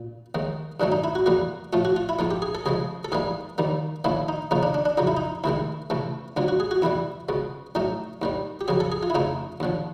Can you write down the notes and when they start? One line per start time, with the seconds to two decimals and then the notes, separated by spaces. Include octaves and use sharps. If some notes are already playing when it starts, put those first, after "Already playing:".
Already playing: A#2
0.35 D#2 D#3 G#3
0.80 G2 D#3 F#3 A3 D4
0.92 D#4
1.04 E4
1.15 F#4
1.26 E2 B2 G3 A#3 F#4
1.73 A2 F3 A3 F4
1.85 F#4
1.96 F4
2.09 E4
2.19 G#2 F3 A#3 F4
2.31 G4
2.42 G#4
2.55 A4
2.66 C#2 C3 F3 G#3 G#4
3.05 A4
3.12 G#2 E3 G3 A#3 G#4
3.58 D#2 D#3 G3 A#3
4.04 D#2 D3 F3 A#3 E4
4.28 D#4
4.51 D#2 C#3 F3 A#3 D#4
4.63 D4
4.74 D4
4.85 D4
4.97 F2 C#3 F#3 D#4
5.07 E4
5.17 D#4
5.44 D2 C3 D#3 G#3 E4
5.90 C#2 C3 E3 A3
6.37 D2 D3 F#3 F4
6.48 F#4
6.60 G#4
6.71 F#4
6.82 E2 B2 G3 E4
7.29 C#2 B2 G#3
7.75 A2 F#3 A3 D#4
8.22 D#2 D#3 G3
8.61 G4
8.68 F2 C#3 F#3 G#4
8.80 A4
8.92 G#4
9.03 F4
9.10 E4
9.15 F2 C#3 F3 A3 D#4
9.60 D#2 D3 F3